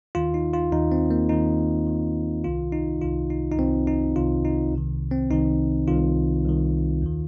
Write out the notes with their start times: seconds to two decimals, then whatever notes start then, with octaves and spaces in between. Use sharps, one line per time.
0.15 D#2 D#3 F4
0.34 D#4
0.54 F4
0.72 D#2 D#3 D#4
0.92 C4
1.11 A#3
1.29 D#2 D#3 D#4
1.87 D#2 D#3
2.44 C2 C3 D#3 F4
2.72 D#4
3.01 C2 C3 D#3 F4
3.30 D#4
3.52 D#4
3.59 C2 C3 D#3 C4
3.87 D#4
4.16 C2 C3 D#3 F4
4.45 D#4
4.73 C2 C3 D#3
5.12 C4
5.30 C2 C3 D#3 D#4
5.88 C2 C3 D#3 F4
6.45 C2 C3 D#3
7.02 D#2 D#3